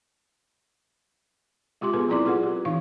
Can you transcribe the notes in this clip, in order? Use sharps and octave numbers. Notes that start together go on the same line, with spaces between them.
G#3 F4 G4 C6 D6
B3 G#4 A4 B4
F#3 C4 E4 D5 C6 D6
F4 G#4 A4 B4 F#5
G4
E3 D#4 F5 C#6